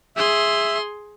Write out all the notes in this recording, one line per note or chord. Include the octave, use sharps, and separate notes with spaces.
G#4 E5 C6